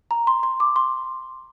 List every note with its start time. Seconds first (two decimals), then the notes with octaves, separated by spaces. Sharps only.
0.11 A#5
0.27 C6
0.43 C6
0.60 D6
0.76 C6